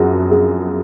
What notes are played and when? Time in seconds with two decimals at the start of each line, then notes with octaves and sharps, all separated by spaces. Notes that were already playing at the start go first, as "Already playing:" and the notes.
Already playing: F#2 F3 F#4 G#4
0.31 G#4